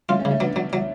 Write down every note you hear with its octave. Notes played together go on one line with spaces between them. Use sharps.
A3 C#4 F4
A3 C#4
C#3
A3 C#4
F#3 B3 D4
F#3
F#3